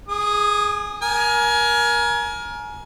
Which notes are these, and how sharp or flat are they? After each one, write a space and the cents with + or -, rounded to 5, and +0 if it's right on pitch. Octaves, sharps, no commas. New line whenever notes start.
G#4 +0 D#6 -40
A#4 +25 G#5 +25